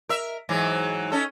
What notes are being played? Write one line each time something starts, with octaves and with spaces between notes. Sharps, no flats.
A#4 E5
G#2 E3 F#3
C#4 D#4 A4